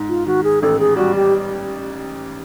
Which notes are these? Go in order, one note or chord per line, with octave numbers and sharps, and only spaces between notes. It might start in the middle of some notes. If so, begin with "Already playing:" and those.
Already playing: G#2
F4
D#3 F#4
G#4
A1 A4
G#4
G3 F#4
G4